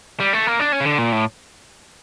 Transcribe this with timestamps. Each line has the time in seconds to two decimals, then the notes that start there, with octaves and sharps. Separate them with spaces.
0.20 G3
0.33 A3
0.47 A#3
0.60 D4
0.72 C#4
0.80 C#3
0.86 D3
0.98 A#2
1.12 A2